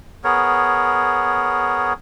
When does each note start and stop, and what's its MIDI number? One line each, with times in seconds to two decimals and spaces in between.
0.24 1.93 59
0.24 1.93 68
0.24 1.93 70
0.24 1.93 73